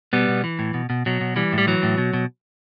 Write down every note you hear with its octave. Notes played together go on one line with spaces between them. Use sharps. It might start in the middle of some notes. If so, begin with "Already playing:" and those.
B2 G3 B3
B2
E3
A2
B2
B2
B2 F#3
B2
E3 G3
A2
G3
E3 F#3
A2
B2
B2